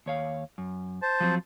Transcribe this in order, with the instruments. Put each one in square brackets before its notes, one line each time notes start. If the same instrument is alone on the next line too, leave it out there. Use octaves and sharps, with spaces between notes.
[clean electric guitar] D#2 C#5 F5
F#2
[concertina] C5 A5
[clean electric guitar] F3 F#3 C4